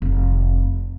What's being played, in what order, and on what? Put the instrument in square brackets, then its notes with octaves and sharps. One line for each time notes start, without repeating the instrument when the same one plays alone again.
[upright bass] F1 D#3